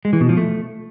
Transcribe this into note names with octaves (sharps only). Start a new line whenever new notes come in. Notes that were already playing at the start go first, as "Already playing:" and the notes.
G#3
E3
B2
F3
A3